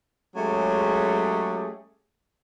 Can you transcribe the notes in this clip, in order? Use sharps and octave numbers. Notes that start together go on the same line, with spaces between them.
F#3 G#3 A3 C#4 G4 G#4